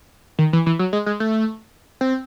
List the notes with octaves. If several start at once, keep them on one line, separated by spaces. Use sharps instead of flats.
D#3
E3
E3
F#3
G#3
G#3
A3
C4